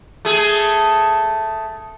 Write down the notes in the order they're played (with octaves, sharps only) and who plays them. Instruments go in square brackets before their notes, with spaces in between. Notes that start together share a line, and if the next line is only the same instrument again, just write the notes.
[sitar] A3 G#4